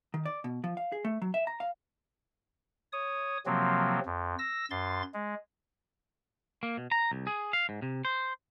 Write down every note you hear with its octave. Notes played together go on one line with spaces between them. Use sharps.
D#3
D5
B2
F3
F5
G#4
A3
F#3
E5
A#5
F5
C#5 D#6
C3 F3 F#3 A#3 C4
F2
E6 A#6
F#2 C6 A6
G#3
A#3
B2
A#5
C2
G#4
F5
G#2
C3
C5